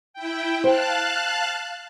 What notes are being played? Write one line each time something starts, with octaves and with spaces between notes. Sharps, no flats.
E4 G5
C5 F5 G5 A5 F#6